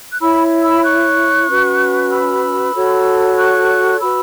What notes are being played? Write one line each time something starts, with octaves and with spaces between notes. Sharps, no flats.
F#6
E4 C#5 B5 E6
B5 E6
C#6 F#6
C#4 F#4 B4
B5 E6
F#4 A4 C#5
C#6 F#6
F#4 B4 B5 E6